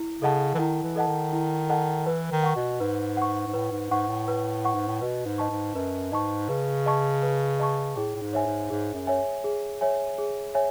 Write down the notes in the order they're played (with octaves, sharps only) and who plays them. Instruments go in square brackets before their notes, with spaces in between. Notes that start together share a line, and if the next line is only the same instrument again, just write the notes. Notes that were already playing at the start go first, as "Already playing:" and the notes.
Already playing: [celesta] E4
[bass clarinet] C#3 [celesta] A4 D#5 F#5 A5
[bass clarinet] E3
[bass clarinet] D#3 [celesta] E4
[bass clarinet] E3
[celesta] A4 D#5 F#5 A5
[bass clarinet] D#3
[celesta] E4
A4 D#5 F#5 A5
[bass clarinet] E3 [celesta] B4
[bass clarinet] D#3
[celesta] F#5 C#6
[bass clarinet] B2
[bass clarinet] G#2 [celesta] B4
[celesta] F#5 C#6
[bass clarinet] G#2
[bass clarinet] A2 [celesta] B4
[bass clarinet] G#2
[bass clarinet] G#2 [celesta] F#5 C#6
[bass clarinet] A2
[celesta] B4
F#5 C#6
[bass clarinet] G#2
A2
[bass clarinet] B2 [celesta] B4
[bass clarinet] G#2
[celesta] D#5 A5 C#6
[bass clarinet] G#2
[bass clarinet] F#2 [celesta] B4
[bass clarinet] G#2 [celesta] D#5 A5 C#6
[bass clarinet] C#3 [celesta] B4
[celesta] D#5 A5 C#6
B4
D#5 A5 C#6
[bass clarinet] A2 [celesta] G#4
[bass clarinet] A2
G#2
[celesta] C#5 E5 G#5
[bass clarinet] G#2
[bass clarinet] G#2 [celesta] G#4
[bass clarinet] F#2
[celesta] C#5 E5 G#5
G#4
C#5 E5 G#5
G#4
C#5 E5 G#5